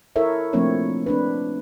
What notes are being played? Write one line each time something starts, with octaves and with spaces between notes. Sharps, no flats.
E4 A4 A#4 C#5 E5
F3 A3 A#3 C4 D4 C#5
C4 D4 B4